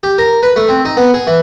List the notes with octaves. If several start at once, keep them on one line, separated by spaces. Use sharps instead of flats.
G4
A#4
B4
A3
C4
D#4
B3
G#4
E3